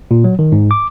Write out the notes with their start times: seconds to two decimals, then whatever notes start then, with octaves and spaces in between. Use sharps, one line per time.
0.11 A#2
0.24 F#3
0.39 D#3
0.52 G#2
0.71 D6